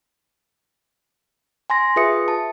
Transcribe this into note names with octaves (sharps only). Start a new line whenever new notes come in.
G#5 C6 A#6
F4 G#4 B4 E5 D#6 C#7
A5